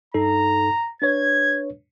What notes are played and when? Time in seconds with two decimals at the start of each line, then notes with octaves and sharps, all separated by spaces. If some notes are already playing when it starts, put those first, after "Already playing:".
0.14 G2 D#4 A4 A#5
1.02 D4 B4 C#5 G#6